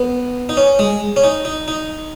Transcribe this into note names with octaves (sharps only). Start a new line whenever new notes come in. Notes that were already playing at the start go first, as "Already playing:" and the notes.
Already playing: B3
D#4
C#4
G#3
C#4
D#4
D#4
D#4